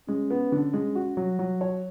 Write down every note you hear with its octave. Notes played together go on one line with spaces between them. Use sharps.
G#3 C#4
B3
D3
G#3
F#4
F#3
F#3
C#5